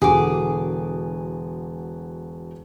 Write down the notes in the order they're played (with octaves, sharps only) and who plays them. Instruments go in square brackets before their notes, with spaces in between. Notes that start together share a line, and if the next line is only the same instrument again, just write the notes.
[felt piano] E1 D3 F#4 [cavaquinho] G#4 D6